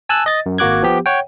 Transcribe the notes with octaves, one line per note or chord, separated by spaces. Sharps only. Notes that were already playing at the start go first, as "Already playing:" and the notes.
G#5 A5 E6 F#6
D#5 A6
F#2
G#1 A#3 F#4 D6 F#6 G#6
F3 B3 G4
C#5 F#5 G5